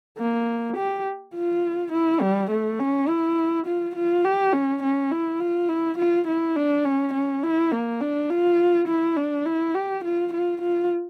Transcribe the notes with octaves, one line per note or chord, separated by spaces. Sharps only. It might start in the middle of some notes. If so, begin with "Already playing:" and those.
A#3
G4
F4
E4
G3
A3
C#4
E4
F4
F4
G4
C#4
C#4
E4
F4
E4
F4
E4
D4
C#4
C#4
E4
A#3
D4
F4
E4
D4
E4
G4
F4
F4
F4